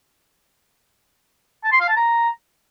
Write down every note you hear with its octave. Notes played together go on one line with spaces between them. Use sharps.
A5
C6
F5
A5
A#5